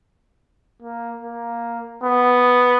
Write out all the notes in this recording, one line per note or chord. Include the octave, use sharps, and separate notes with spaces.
A#3
A#3
B3